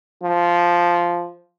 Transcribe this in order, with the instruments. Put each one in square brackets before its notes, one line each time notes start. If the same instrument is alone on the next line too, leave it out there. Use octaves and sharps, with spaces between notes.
[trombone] F3